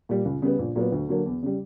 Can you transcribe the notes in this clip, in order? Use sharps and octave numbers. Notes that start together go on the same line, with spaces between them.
A#2 G3
C#2
C#3 G3 B3
A#1
A#2 F#3 B3
D2
D3 F#3 A#3
E2
C#3 G3